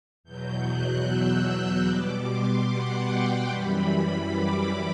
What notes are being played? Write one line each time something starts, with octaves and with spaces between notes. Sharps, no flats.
E2 B2 F#3 G6
F#6
E6
B2 G3 D6
C6
F#5
G5
F#2 E3 G3 B5
B5
D6